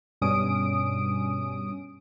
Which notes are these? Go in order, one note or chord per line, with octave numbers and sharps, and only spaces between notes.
G2 B2 G3 C#4 D#6 D7